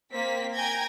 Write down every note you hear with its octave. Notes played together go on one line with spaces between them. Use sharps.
A#3 C4 B6
G5 G#5 A#5 G6 G#6 A#6